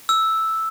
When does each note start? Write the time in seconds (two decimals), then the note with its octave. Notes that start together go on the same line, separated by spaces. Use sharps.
0.09 E6